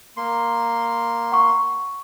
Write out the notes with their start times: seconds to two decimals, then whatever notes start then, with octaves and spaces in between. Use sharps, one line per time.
0.17 A#3 C6
1.32 F#5 C#6